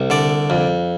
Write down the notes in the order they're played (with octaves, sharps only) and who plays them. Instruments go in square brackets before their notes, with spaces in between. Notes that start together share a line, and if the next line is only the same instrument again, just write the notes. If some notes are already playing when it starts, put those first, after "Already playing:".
Already playing: [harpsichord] C2 C3
D3 D5
F2